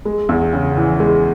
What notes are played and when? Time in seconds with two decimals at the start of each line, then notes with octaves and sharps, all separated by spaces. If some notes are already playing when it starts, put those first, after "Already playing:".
0.05 G#3
0.29 E2
0.53 C#3
0.77 E3
1.00 G#3